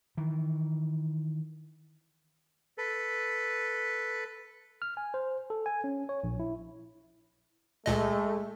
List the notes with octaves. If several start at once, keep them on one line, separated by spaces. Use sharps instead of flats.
D#3 E3
A4 B4
F6
G#5
C5
A4
G#5
C#4
C#5
A#1
E4
C#2 A#2 G#3 A3 D#5